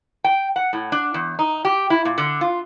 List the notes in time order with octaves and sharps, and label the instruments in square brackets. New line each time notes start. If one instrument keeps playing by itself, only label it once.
[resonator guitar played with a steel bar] G5
F#5
A2
D4
E2
D#4
G4
E4
A#2
D3
F4